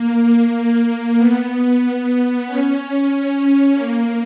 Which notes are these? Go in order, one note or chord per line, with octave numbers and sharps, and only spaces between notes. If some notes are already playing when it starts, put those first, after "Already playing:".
Already playing: A#3
A#3
B3
C#4
A#3